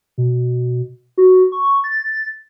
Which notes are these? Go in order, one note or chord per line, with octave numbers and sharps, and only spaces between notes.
B2
F#4
C#6
A6